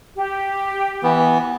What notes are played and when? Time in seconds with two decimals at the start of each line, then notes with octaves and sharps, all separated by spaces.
0.16 G4
1.03 E3 B3